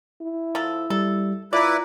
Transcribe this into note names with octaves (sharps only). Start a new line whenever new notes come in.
E4
F3 A4
G3 A4
E4 F4 B4 D5 A#5